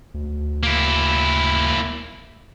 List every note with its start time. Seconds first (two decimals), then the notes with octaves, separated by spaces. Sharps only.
0.14 D2
0.63 A#3 E4